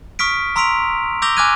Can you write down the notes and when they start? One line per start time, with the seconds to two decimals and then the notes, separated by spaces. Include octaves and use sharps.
0.19 C#6 D#6 F6 B6 D7
0.56 A#5 C6 E6 B6 D7 F7
1.22 D6 E6 G6 A#6 F7 G7
1.37 G#5 D6 F6 F#6 G#6 D#7